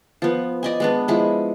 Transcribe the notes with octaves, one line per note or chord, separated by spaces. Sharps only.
F3 B3
D5 D#5 G#5
G#3 B3 D4
F3 G#3 E4